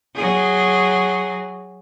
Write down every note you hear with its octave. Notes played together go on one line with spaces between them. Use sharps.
F#3 G#4